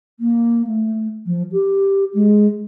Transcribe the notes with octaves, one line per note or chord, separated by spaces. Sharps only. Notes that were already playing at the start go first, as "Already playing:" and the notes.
A#3
A3
F3
G4
G#3